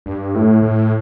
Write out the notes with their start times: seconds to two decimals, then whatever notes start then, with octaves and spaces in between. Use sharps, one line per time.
0.06 G2
0.35 A2
0.62 A2